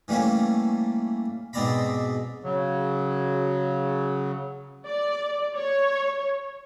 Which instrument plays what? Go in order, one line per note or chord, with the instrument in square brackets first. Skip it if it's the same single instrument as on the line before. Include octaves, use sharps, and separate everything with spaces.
[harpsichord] E3 G3 A3 A#3 C#4
G#2 B2 C4 D5 A#5 B5
[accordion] C#3 F#3
[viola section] D5
C#5